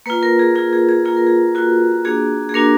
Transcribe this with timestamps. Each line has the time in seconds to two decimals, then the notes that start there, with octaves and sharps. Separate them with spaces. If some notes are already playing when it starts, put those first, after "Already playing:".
0.06 A#3 F4 B4
0.23 A#4
0.39 G#4
0.55 A#3 F4 G#4
0.73 G#4
0.89 G#4
1.05 A#3 F4 G#4
1.17 A#4
1.27 G#4
1.55 A#3 F4 F#4
2.05 A#3 D4 F#4 G#4
2.49 G#4
2.54 A#3 D4 F#4 A#4